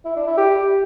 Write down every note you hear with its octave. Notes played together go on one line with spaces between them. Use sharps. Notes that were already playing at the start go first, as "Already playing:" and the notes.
E4
D4
E4
G4